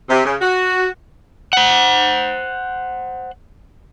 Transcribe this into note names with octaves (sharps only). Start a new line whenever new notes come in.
C3
C#3
F#4
C5 F#5